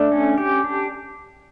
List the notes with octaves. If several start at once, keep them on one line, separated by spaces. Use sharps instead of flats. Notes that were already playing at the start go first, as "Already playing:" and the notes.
Already playing: A3 D4
C#4
G4
D4